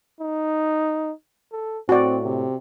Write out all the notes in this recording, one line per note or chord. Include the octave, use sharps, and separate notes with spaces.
D#4
A4
A2 C4 F#4 D5
C3